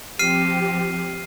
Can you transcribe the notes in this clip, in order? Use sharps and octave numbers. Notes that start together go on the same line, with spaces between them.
F3 C4 G4 F6 C7 D#7